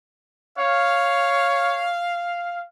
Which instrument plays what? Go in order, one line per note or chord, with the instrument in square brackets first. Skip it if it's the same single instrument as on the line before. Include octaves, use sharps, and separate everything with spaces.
[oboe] C#5 [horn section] F5